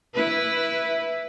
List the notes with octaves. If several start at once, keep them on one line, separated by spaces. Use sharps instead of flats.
E4 B4